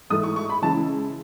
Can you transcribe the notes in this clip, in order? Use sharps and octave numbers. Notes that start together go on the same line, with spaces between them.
G#2 E3 A3 D#6
C#6
C#6
B5
C#3 E3 G#3 A5